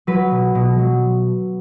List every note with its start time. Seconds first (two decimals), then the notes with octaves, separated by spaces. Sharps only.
0.07 F#3 B4
0.31 B2
0.55 B2
0.79 F#3